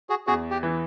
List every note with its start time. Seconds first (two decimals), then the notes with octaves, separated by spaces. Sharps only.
0.10 F#4 G#4
0.27 E2 F#4 G#4
0.51 G4
0.63 E3